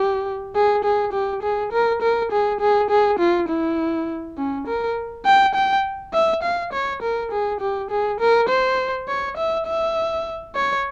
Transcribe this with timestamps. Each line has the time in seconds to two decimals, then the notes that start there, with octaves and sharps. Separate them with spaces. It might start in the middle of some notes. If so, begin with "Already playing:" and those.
Already playing: G4
0.55 G#4
0.84 G#4
1.13 G4
1.42 G#4
1.72 A#4
2.02 A#4
2.32 G#4
2.60 G#4
2.90 G#4
3.20 F4
3.48 E4
4.38 C#4
4.67 A#4
5.26 G5
5.55 G5
6.13 E5
6.43 F5
6.73 C#5
7.02 A#4
7.32 G#4
7.61 G4
7.90 G#4
8.20 A#4
8.49 C5
9.08 C#5
9.37 E5
9.67 E5
10.55 C#5